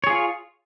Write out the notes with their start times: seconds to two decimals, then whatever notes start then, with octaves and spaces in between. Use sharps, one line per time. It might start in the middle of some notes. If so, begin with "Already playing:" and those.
0.04 C#5
0.07 G#4
0.10 F4